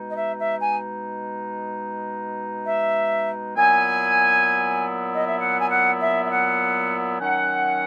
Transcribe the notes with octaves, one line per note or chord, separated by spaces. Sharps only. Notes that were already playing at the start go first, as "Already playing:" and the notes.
Already playing: B2 G#3 D#4
D#5
E5
E5
G#5
E5
A#2 F#3 B3 E4 G#5
D#5
E5
F#5
G#5
F#5
E5
E5
F#5
D#3 F#3 C#4 F#5